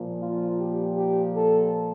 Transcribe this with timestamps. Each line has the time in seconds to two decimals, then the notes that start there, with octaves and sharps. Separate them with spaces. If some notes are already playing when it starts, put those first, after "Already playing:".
Already playing: A#2 F3
0.22 F4
0.60 G4
0.96 G4
1.34 A4